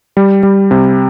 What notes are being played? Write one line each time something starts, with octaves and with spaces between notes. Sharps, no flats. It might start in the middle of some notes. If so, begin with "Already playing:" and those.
G3
G3
C3